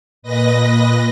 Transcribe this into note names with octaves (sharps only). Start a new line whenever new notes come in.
A#2 B4 D#5 A#6